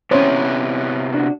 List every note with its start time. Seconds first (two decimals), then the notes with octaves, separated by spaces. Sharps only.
0.11 C3 B3 C#4 E4 C5 C#5
1.14 D4 F#4